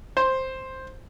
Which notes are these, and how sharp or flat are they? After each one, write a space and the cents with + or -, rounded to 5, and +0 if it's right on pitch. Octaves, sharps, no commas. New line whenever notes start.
C5 +5